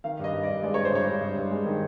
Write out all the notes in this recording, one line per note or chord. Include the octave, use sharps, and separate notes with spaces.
D#3 F5
G2 D#5
G2
D5
G2
G#3 D5
G2 C#5
C5
G2 C#5
G2
G2
G2
G#3
D#3